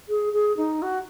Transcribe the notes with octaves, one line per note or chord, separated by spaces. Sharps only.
G#4
G#4
D#4
F#4